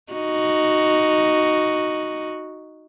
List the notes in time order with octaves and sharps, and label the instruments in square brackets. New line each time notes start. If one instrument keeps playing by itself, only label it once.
[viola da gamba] D#4 F#4